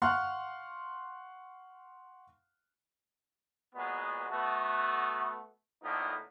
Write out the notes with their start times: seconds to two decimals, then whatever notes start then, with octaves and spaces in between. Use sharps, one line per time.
0.02 F5 F#5 C6 C#6 F6 F#6
3.75 A#2 F#3 G#3 B3
4.30 A3 B3 F#4
5.83 F2 A2 D3 A#3 B3 D#4